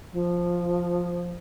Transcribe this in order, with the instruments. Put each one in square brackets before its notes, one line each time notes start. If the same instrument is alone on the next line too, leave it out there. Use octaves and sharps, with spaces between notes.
[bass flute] F3